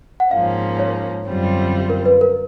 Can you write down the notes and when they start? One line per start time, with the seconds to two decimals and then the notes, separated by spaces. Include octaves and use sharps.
0.20 F#5
0.31 G#2 F3 A#3 C#4 F5
0.79 C#5
1.27 F#2 D3 G3 C4 F4
1.89 A#4
2.06 B4
2.21 A#4